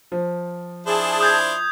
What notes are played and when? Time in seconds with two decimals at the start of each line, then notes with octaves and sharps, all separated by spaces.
0.12 F3
0.87 D4 E4 G#4 C5 A5
1.20 D#6 G6 G#6